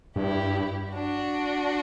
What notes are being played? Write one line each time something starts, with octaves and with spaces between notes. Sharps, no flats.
G2 E4 G4
D4 F#4